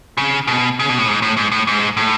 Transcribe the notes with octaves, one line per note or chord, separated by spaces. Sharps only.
C#3
B2
C#3
B2
A2
G#2
A2
G#2
A2
G#2
A2